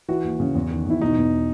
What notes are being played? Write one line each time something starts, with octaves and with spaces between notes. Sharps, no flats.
E3 F#4
D#2
C#3
E2
D#3
E2 E4
B2 D#4
E2